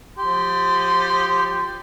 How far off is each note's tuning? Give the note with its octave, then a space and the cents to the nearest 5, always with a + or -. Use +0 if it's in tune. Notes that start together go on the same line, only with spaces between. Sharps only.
F3 +30 G4 +0 C6 -20